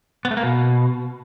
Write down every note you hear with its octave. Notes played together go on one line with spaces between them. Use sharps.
B3
A3
A#3
B2